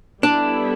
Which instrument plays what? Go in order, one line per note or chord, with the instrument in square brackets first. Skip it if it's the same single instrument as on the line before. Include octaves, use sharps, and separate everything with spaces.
[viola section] G3 B3 E4 A4 [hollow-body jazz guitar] D4